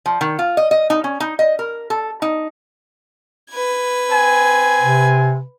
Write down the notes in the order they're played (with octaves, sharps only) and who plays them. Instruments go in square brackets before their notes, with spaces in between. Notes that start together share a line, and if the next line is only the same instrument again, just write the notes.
[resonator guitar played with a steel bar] F3
D#3
F4
D#5
D#5
D#4
C#4
D#4
D#5
A#4
A4
D#4
[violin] B4 G#6
[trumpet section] C4 G#5
[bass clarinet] C3